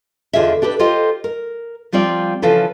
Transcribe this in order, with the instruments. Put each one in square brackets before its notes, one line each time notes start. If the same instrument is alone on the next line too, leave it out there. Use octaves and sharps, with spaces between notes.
[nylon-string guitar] E2 D3 F4 G#4 D#5 E5
D4 G4 A4 B4
F4 G4 A4 C5 D#5
A#4
F3 G3 C4 F4 D5
C#3 E3 F3 F4 A4 B4